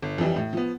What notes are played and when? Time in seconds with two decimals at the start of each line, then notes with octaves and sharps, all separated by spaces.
0.02 G1
0.18 F2 E3 G3
0.36 A2
0.53 F3 B3